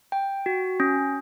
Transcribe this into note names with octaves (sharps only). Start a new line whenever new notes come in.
G5
F#4
C#4